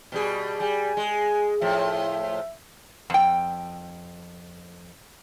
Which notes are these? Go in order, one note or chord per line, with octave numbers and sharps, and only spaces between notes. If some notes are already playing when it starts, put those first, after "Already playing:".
B2 G3 G#4
G3 G#5
G#3
A2 F3 E5
F2 G5